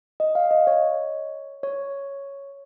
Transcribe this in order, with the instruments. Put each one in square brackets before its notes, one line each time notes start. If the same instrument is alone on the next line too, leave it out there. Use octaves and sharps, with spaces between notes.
[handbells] D#5
F5
D#5
C#5
C#5